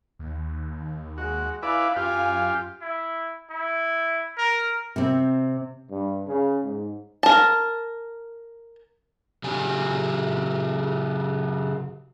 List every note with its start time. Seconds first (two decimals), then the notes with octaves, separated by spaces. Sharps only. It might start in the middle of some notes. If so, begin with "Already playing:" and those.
0.19 D#2
1.18 G#3 F#4
1.63 E4 B4 D5 F5 G#5
1.96 F#2 F4 G4 F5 G#5
2.82 E4
3.50 E4
4.38 A#4
4.96 C3 C4
5.90 G2
6.26 C#3
6.64 G#2
7.23 A#4 A5
9.44 C#3 F#3 G4 G#5